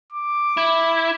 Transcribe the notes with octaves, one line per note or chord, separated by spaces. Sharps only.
D6
E4